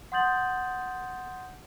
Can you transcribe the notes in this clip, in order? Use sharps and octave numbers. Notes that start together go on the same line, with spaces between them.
F#5 C6 D#6 G6 A6 F#7